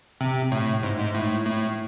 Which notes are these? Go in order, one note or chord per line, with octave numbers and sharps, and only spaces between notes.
C3
A2
G#2
G#2
A2
A2